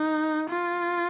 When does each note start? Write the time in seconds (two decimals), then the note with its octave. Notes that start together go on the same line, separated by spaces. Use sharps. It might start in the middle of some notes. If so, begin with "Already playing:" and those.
Already playing: D#4
0.50 F4